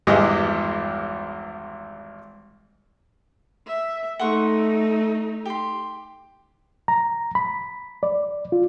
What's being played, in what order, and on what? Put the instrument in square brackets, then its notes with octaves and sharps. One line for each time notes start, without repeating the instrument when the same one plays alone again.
[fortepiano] G#1 E2 G2 G#3 G4 D#5
[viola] E5
[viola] A3 D#4 [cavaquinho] F#5 C6 C#6
[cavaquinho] G4 C6
[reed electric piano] A#5
B5
D5
F4